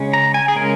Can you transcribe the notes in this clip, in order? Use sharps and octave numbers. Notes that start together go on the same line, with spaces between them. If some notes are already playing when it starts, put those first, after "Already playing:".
Already playing: C#3 G#3 C#4
A#5
G#5
G#4
C#3 G#3 C#4 A#4